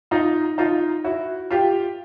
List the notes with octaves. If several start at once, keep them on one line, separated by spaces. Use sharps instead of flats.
D#4 F4
D#4 F4
E4 F#4
F4 G4